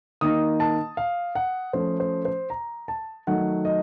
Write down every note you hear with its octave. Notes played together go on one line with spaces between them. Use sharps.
D#3 A#3 D#4 D#6
A5
F5
F#5
F3 A3 C#4 C5
C5
C5
A#5
A5
D#3 F#3 A3 D#4 F#5
D#5